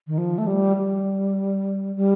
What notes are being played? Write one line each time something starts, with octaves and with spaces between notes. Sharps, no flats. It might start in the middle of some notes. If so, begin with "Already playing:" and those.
D#3
F3
A3
G3
G3
G3